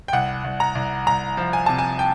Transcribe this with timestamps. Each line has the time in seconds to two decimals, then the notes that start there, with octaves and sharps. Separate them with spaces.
0.08 G5
0.13 C2 F#5
0.44 C2
0.60 A#5
0.75 C2
1.06 C2 A#5
1.37 F3
1.53 G#5
1.66 C3 A5
1.78 G#5
1.99 G5